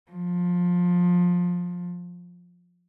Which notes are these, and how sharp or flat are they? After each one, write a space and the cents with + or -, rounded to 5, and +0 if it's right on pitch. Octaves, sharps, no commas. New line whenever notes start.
F3 +20